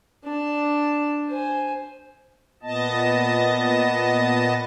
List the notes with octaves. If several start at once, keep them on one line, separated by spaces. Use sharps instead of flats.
D4 A5
C5 G#5
A#2 B3 D#5 A5